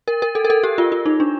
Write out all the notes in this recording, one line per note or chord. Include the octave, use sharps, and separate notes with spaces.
A#4
A#4
A4
A#4
A4
G4
F4
F4
D#4
D4